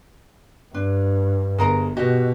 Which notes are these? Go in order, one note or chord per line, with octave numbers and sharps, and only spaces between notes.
G2 D4
G1 G#4 A#4 A#5
B2 F#4 G4 D#5